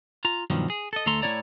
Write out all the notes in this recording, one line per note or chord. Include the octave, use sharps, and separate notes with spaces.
F4 A#5
G2 B2 D#3 F3 F#3
G#4
A4 D#5
D2 A3 A4 A#5 C6
A2 C#4 E4 C#5 D5 A#5